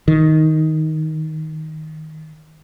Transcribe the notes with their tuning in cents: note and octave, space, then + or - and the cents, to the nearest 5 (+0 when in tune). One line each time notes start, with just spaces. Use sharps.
D#3 +10